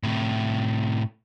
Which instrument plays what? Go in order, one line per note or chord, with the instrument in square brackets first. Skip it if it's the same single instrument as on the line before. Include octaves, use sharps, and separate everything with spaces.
[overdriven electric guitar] A2 C3